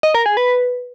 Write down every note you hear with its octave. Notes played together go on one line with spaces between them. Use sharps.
D#5
A#4
G#4
B4